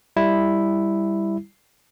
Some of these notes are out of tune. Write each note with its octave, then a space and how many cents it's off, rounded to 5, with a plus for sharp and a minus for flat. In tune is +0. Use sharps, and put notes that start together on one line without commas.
G3 +10 E4 +0